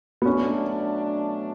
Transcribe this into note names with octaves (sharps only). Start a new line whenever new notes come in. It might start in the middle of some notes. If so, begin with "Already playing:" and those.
B3
B2 F#3 A3 C#4 D4